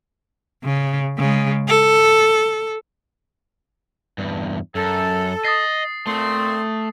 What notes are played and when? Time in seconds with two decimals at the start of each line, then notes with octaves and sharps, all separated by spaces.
0.64 C#3
1.18 C#3 G#3
1.68 A4
4.18 E2 G2
4.75 F#2 A4
5.45 D#5 D#6 A6 C7
6.07 A#2 A3 C4 C6